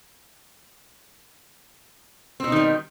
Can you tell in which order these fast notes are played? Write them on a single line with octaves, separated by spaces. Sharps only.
C4 B2 D#4 D#3 G3